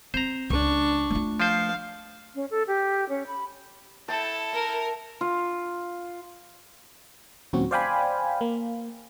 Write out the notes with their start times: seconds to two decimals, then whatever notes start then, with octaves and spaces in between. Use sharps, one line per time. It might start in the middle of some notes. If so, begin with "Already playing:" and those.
0.14 C4 C5 A#5
0.50 C#2 D4 C#6
1.11 A3 F4
1.40 F3 C5 F5
2.35 C#4
2.51 A4
2.67 G4
3.09 C#4
3.27 B5
4.08 E4 A4 G5 A5
4.53 A#4 E5
5.21 F4
7.53 D#2 A#2 F#3 C4 C#4 F#4
7.71 C5 D5 F5 G5 G#5 B5
8.41 A#3